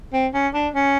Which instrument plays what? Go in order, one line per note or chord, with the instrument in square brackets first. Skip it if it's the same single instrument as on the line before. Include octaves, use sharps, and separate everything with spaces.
[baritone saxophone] C4
C#4
D4
C#4